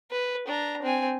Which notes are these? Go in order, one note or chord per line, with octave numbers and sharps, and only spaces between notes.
B4
D4 A#5
C4 G#5